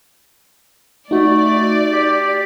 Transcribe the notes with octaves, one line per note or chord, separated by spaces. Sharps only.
A3 D#4 F#4 D5
G4